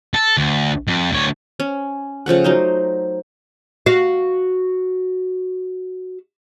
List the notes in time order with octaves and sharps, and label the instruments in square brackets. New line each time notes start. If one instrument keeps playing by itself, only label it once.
[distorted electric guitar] A4
D2
F2
D2 C#5
[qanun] C#4
C#3 F3 A3 F#5
F#3 D#4 C5
[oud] F#4 F5